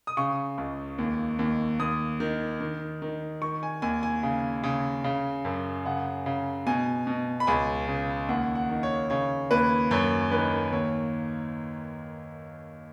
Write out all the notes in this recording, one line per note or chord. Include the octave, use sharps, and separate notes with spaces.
D#6
C#3 C#6
C#2
D#2
D#2
D#2 D#6
D#3
D#3
D#3
D#3 C#6
G#5
D#2 G#5
G#5
C#3
C#3
C#3
F#2
C#3 F#5
C#3
B2 G#5
B2
B5
C#2 G#5
C#3
D#2 F#5
F#5
D#3
C#5
C#3 C#5
D#2 B4
F#2 C#5
D#3 B4
D#2 C#5